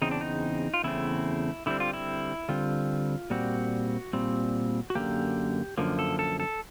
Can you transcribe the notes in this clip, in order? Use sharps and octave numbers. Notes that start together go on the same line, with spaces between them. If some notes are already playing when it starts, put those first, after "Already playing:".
E2 C#3 C4 D#4
D4
D#4
F4
E2 C#3 A3 C4 E4
D3 G3 C4 E4
F4
E4
D3 G3 C4 F4
A#2 G3 C4 F#4
A#2 G3 C4
F#4
F#2 D3 F3 A#3 G4
F#2 D3 F3 A#3
A4
A4
A4